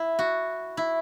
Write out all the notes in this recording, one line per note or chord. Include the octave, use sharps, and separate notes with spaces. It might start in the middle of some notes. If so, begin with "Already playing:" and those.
Already playing: E4
F#4
E4